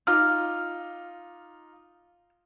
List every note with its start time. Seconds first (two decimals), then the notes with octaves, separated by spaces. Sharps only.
0.07 D#4 F4 D6 F6